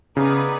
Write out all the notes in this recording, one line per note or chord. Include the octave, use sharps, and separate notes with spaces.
C#3 B3 D#4 G#4 B4 D5